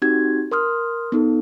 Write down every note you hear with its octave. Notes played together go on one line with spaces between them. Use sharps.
C4 D#4 F#4 G4 G#6
A#4 C6 D#6 F6
B3 D#4 A4